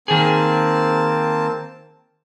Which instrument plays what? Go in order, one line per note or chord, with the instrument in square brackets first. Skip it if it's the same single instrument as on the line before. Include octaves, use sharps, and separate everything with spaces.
[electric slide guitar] D#3 G#4 [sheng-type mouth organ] A#3 C4 A5